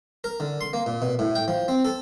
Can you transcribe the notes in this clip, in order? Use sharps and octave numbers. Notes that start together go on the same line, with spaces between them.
A#4
D3
C6
A#3
A#2
B2
A2
G5
F3
C4
A4